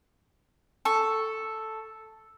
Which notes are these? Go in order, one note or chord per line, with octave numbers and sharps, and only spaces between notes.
A4 C#6